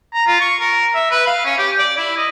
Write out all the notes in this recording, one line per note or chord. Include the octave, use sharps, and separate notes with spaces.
A#5
F4
C#6
A#4
E5
B4
F5
C#4
G4
D5
E4
D#5